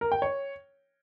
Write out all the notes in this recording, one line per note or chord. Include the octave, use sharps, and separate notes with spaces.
A#4
G5
C#5